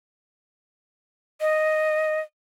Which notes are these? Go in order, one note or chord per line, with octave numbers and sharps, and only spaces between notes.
D#5